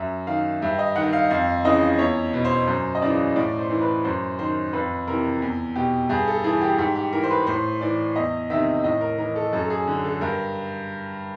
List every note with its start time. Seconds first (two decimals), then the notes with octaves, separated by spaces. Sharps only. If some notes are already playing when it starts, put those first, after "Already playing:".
Already playing: F#2 E5
0.27 D#3 F5
0.62 G2 E5
0.79 D#5
0.95 D#3 F#5
1.13 F5
1.30 F2 F5
1.65 C#3 E3 D#5
1.99 E2 C#5
2.33 B2
2.45 C5
2.68 F#2 C5
2.95 D#5
3.02 C#3 E3 D5
3.36 A2 D5
3.59 C5
3.70 E3
3.82 B4
4.04 F#2 C5
4.39 D#3 C5
4.73 F2 B4
5.07 C3 E3 A#4
5.42 E2
5.75 B2 G4
6.09 G2 G#4
6.28 A4
6.44 E3 G#4
6.61 G4
6.78 G#2 G4
6.95 G4
7.13 E3 A#4
7.23 C5
7.31 B4
7.47 A2 C5
7.81 E3 D5
8.16 E2 D#5
8.50 C3 D#3 E5
8.84 A2 D#5
9.01 A#4
9.18 E3 A#4
9.36 A4
9.53 F#2 A4
9.65 A4
9.70 G#4
9.87 D3
10.05 A4
10.21 G2 A#4